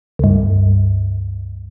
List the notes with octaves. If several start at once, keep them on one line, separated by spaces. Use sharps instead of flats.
C#2 G2